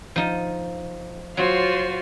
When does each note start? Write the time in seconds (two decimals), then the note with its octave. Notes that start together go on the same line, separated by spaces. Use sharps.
0.16 F3 D#4
1.37 F#3 F4 F#4 C5